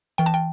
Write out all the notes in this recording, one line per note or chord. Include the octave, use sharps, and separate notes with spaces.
E3 G5
A5
G5